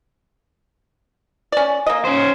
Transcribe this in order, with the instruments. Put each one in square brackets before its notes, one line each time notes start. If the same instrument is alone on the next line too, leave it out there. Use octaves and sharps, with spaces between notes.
[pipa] C#4 D5
A#3 D#5
[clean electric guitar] C#4 C5